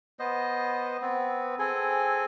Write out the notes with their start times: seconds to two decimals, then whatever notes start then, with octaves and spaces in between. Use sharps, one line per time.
0.19 B3 C5 D#5
1.02 B3 C4
1.59 C4 G#4 A4 G#5